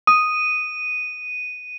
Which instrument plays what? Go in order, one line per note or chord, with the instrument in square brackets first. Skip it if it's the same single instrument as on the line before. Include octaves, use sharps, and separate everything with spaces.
[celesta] D#6 [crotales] D#7